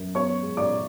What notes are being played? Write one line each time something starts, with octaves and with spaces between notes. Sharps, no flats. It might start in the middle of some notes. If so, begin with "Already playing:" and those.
Already playing: F#2
B3 C#5 C#6
G#3
D5 D6